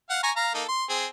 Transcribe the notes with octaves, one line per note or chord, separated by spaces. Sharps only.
F5 F#5
G#5 A#5 C#6
F5 A#5
A#3 D#4 A4
C6
C4 G#4